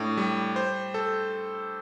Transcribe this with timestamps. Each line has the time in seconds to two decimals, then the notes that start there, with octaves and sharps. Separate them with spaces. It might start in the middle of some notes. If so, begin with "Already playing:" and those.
Already playing: A2 D4
0.17 G3
0.56 C5
0.94 A4